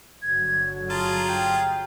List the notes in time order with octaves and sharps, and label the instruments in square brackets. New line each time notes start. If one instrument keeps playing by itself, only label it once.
[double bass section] G1 D3 F#3 [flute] G#6
[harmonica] F4 G#4 [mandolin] A5 [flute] A#5
[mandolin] G4